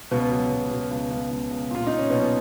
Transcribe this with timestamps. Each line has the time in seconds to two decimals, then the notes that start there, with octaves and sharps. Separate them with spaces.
0.11 C#2 B2 B3
0.32 F#3
0.51 B2
0.71 B2
0.91 C#2
1.11 C#2
1.31 C#2
1.51 C#2
1.71 A#2 F4
1.87 A#2 D#4
1.98 C#4
2.10 B2 F#3 B3